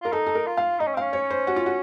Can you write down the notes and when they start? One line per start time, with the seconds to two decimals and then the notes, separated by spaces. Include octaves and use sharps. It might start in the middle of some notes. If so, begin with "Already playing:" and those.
0.02 F4 A#4
0.12 D#4 A4
0.26 A4
0.35 A#4
0.46 F4
0.57 F5
0.79 D#4 D#5
0.87 C#4
0.94 C4
0.97 C#4 F5
1.13 C#5
1.30 C5
1.47 F#4
1.56 F4
1.66 F#4